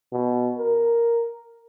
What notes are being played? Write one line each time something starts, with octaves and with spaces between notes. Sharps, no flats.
B2
A#4